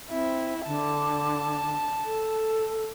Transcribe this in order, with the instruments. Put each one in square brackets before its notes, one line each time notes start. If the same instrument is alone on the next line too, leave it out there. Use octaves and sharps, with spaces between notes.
[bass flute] C4 [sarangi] E4
[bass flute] D3 [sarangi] A5
[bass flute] A4